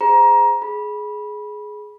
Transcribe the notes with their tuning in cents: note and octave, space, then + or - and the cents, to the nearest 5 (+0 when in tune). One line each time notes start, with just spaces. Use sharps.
G#4 -5 C5 -20 A#5 +20
G#4 +15 B5 -20